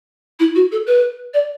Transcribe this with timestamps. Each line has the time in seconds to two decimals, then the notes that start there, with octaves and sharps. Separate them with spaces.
0.40 E4
0.55 F#4
0.72 A4
0.87 B4
1.34 D5